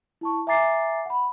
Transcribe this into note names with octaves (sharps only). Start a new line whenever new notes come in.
E4 A5 C#6
E5 G#5 A#5 D6 A6 C7
F#5 B5